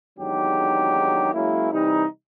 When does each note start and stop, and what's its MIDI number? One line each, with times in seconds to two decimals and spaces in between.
0.18 1.29 32
0.18 1.29 40
0.18 1.29 54
0.18 1.29 62
0.18 1.29 63
0.18 1.29 67
1.33 1.72 54
1.33 1.72 56
1.33 1.72 58
1.33 1.72 61
1.33 1.72 64
1.73 2.05 48
1.73 2.05 52
1.73 2.05 55
1.73 2.05 63